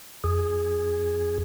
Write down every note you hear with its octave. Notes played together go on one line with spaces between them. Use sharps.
F2 G#4